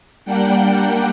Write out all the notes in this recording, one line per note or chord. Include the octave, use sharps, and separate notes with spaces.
G3 A#3 D4 F#5 G5